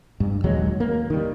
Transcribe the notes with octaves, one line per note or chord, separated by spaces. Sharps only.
G2
D#1 D#2 F#3 G#3
A#3
D#3 G3